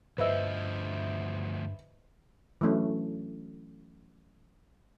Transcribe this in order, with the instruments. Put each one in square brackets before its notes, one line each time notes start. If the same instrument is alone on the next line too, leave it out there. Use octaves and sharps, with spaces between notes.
[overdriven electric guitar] D2 F3 [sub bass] G2 [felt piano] B4 E5 [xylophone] C5 D#5 E6
[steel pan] E3 F#3 A3 C#4 D4